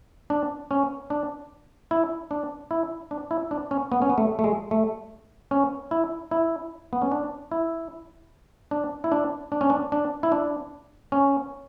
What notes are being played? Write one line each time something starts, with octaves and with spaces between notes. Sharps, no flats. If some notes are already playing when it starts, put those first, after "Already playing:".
D4
C#4
D4
E4
D4
E4
D4
E4
D4
C#4
B3
C#4
B3
A3
A3
G#3
A3
C#4
E4
E4
B3
C#4
D4
E4
D4
E4
D4
D4
C#4
D4
D4
E4
D4
C#4